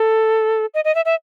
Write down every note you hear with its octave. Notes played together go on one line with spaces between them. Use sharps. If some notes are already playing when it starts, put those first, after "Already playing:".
Already playing: A4
D#5
D#5
E5
E5